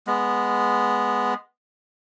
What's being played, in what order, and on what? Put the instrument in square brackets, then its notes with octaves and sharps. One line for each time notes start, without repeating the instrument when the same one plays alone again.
[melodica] G#3 B3